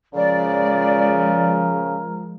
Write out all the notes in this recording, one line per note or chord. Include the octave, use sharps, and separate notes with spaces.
C#3 F3 G#3 A#4 D5